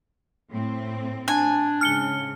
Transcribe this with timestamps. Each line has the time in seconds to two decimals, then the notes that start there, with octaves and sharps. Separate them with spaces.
0.51 A2 C4
1.28 D4 G#5
1.81 G#2 C#3 F6 C#7 G7